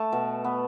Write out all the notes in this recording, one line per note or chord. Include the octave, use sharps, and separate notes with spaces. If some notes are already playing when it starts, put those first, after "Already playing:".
Already playing: A3 A5
B2
B3